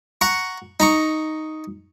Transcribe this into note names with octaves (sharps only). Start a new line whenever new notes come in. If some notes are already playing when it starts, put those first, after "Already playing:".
F#5 A#5 C#6
D#4 A#5 C#6